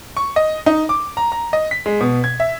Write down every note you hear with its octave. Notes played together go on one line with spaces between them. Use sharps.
C#6
D#5
D#4
D6
A#5
A#5
D#5
B6
G#3
B2
G#6
E5